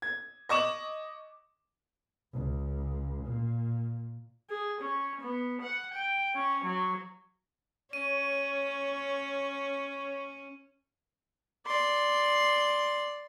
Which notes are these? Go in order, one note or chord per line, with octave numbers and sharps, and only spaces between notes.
G#6
D#5 C#6 D6 E7 F#7
C#2
A#2
G#4
C#4
B3
F#5
G5
C#4
F#3
C#4 C#5 D#7
D5 C6